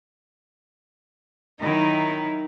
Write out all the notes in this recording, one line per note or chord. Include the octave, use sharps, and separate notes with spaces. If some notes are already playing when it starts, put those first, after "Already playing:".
D#3 F#3 D#4 E4